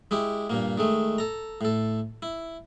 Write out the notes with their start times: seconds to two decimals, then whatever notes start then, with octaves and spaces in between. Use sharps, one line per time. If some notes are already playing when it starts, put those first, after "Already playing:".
0.11 G#3 E4 G4
0.50 G2 A#2 A#3
0.78 D#3 G#3 A3
1.18 A4 A#5
1.61 A2 A4
2.22 E4